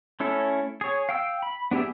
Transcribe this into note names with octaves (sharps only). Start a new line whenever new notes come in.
A3 C#4 E4 A4
G#4 C#5
F5 G5 E6
B5
B3 D4 G4 G#4 E5